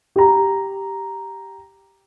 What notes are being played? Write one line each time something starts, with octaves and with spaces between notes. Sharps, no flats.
G4 A#5